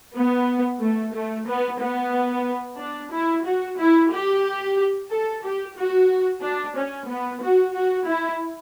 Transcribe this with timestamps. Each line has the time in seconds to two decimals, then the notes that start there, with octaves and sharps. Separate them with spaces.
0.14 B3
0.80 A3
1.13 A3
1.46 B3
1.79 B3
2.78 D4
3.12 E4
3.44 F#4
3.78 E4
4.10 G4
5.10 A4
5.42 G4
5.75 F#4
6.42 D4
6.75 C#4
7.08 B3
7.41 F#4
7.74 F#4
8.07 E4